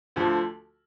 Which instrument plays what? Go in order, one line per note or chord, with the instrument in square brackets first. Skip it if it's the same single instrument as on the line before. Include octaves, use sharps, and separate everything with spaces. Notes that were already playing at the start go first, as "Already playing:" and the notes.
[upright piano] D2 D3 F3